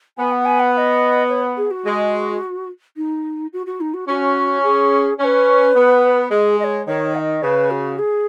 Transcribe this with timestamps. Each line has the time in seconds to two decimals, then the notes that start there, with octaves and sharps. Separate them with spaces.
0.18 B3 G#5
0.31 F#5
0.45 G#5
0.60 F#5
0.73 F#5
0.77 D#5
1.29 C#5
1.57 G#4
1.71 F#4
1.85 G#3
2.97 D#4
3.53 F#4
3.66 F#4
3.80 D#4
3.94 F#4
4.08 C#4 F#4
4.63 G#4
5.19 C#4 C#5
5.24 B4
5.75 B3
6.31 G#3 G#4
6.59 D#5
6.64 C#5
6.86 D#3 C#5
7.15 F#5
7.19 D#5
7.43 C#3 B4
7.70 F#4
7.99 G#4